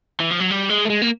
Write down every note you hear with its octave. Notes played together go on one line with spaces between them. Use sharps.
E3
F3
F#3
G3
G#3
A3
G#3
A#3